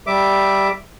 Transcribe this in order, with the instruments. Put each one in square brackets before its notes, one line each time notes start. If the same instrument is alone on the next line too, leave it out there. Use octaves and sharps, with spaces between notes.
[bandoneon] G3 E5 D6